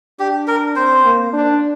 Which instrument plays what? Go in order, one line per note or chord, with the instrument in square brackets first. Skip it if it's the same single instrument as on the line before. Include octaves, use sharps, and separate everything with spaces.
[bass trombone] D4 [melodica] G4
[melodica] A#4
[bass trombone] C4 [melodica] C5
[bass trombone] A#3
D4